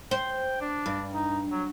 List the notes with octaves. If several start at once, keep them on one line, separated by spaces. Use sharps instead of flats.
C5 G5
D4
G2
D#4
F#3